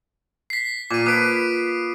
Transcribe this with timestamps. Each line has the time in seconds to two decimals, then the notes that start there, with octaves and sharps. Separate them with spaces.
0.50 B6 C7
0.91 A#2 D6 D#7
1.06 B4 D#6 D7